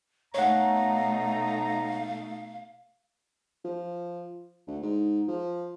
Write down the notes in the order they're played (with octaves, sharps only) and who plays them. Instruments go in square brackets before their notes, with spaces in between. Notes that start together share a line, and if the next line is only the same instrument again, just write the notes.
[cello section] B2 A3 D#4 [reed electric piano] C#5 F#5 [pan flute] F5 [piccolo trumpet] A#5
[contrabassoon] F3
D2
G#2
F3